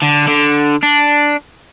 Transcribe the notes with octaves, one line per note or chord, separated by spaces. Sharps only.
D3
D3
D4